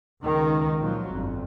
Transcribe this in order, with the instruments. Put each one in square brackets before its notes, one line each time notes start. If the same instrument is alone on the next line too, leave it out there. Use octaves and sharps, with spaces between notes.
[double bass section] C#2 D#3
A#2 F3 F#3
G1 F2